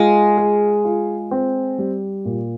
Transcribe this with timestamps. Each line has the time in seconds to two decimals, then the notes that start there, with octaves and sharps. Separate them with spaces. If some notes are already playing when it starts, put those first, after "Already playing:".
Already playing: G#3 F4
0.37 G#4
0.85 F4
1.31 C4
1.78 G3
2.25 A#2